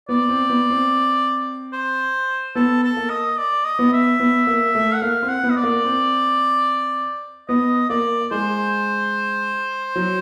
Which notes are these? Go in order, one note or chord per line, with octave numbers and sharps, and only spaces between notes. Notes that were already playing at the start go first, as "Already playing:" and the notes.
B3 D5
C4
B3
C4
C5
B3 A4
A4
A#3
D#5
D5
D#5
B3
E5
B3
A#3
A3
F#5
A#3 F5
C4
F#5
B3
D#5
D5
A#3
C4
B3 D#5
A#3 D5
G#3 C5
F#3